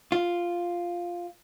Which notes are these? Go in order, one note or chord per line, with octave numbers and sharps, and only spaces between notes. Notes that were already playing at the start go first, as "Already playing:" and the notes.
F4